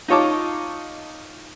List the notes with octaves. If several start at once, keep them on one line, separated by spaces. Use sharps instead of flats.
D#4 F4 C#5 A5 D6